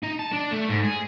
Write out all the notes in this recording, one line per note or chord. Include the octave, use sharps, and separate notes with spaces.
D#4
A5
D4
A3
G#2
G#4